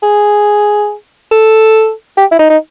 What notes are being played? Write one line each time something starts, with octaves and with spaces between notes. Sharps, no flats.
G#4
A4
G4
E4
D#4
D#4